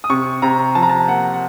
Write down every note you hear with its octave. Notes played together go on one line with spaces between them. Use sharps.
D#6
C3 C#6
C3 A#5
F3 A5
A#5
A5
A#3 F#5
F#5